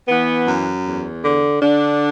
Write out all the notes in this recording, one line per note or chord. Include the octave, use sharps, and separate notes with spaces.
E3 B3
F#2
E2
D3
D3 D4